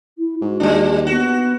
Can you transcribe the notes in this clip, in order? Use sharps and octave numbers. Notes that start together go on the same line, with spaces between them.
E4
G#2 F#4
D#2 G3 D4
B3 F#4